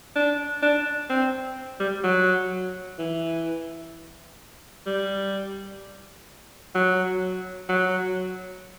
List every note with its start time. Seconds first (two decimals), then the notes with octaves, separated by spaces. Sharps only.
0.16 D4
0.63 D4
1.10 C4
1.80 G3
2.04 F#3
2.99 E3
4.87 G3
6.75 F#3
7.69 F#3